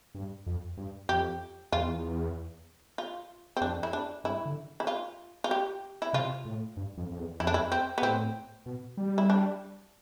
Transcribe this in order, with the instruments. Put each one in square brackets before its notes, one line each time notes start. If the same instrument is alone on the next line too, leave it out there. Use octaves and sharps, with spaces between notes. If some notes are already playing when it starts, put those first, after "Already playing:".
[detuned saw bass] G2
F2
G2
[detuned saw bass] F2 [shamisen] G4
[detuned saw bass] E2 [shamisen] F4
[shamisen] F4
C4
[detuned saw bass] F2 [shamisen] D4
[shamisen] E4
D4
[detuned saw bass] G2 [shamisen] E4
[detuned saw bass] D3
[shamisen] E4
F4
F4
G4
E4
[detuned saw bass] C3 [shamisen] F4
[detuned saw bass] A2
G2
F2
F2
E2
[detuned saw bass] F2 [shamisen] E4
[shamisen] D4
E4
C4
B3
[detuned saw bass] A2 [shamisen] C4
[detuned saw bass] B2
G3
[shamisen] E4
D4